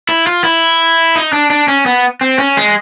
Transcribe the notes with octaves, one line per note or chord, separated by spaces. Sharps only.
E4
F4
E4
D#4
D4
D4
C#4
B3
C4
C#4
G#3